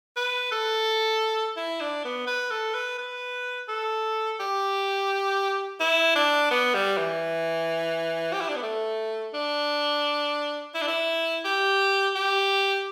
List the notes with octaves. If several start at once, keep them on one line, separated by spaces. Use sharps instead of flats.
B4
A4
E4
D4
B3
B4
A4
B4
B4
A4
G4
E4
D4
B3
G3
E3
G4
E4
D4
B3
A3
D4
E4
D4
E4
G4
G4